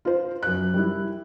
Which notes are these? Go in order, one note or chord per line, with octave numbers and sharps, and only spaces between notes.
F4 C5
F#2 F#6
G3 E4